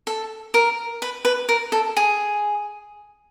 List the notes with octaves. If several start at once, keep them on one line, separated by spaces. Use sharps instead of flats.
A4
A#4
B4
B4
A#4
A4
G#4